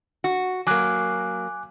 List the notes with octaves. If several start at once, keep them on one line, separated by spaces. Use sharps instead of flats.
F#4
F#3 A#3 G#5 D6 F#6